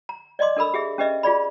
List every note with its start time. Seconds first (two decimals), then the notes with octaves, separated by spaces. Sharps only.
0.09 A#5
0.39 D5 D#5 G#5 C6 D6
0.57 D4 A4 A#4 B5 E6
0.74 G4 G#4 E5
0.98 C#4 G4 B4 D#5 E5
1.23 F4 G#4 D5 B5